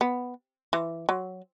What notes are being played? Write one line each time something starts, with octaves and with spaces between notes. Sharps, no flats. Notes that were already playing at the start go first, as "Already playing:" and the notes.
B3
E3
F#3